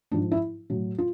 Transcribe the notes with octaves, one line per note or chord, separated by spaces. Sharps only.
G#2 F3 D4
E4
A2 F#3
F4